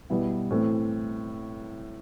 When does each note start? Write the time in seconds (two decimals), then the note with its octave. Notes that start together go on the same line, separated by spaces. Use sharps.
0.10 B2 G3 B3 E4
0.50 A2 E3 A3 C4